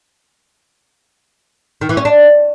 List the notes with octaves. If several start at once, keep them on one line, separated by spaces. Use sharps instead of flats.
D#3
E3
C#4
D4